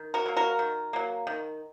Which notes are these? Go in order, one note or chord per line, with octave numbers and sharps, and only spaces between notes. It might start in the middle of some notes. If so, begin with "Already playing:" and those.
Already playing: D#3
F#4 A#4
F#3 A#3
F#4 A#4
D#3
F#3 A#3
D#3